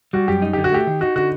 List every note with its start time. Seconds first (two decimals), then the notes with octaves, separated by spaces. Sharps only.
0.13 G3 F#4
0.28 F#2 G4
0.42 D#4
0.53 D3 G4
0.64 F#4
0.72 A3 G4
0.87 D#3
1.01 D#4 F#4
1.16 D3 F#4